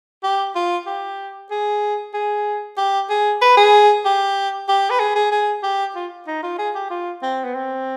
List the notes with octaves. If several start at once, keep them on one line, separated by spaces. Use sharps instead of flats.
G4
F4
G4
G#4
G#4
G4
G#4
B4
G#4
G4
G4
B4
G#4
G#4
G#4
G4
F4
D#4
F4
G#4
G4
F4
C4
B3
C4